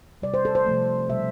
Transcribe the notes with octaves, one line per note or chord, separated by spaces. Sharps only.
C3 G3 D5
C5
A4
C5
C3 F3 A3
B2 G3 E5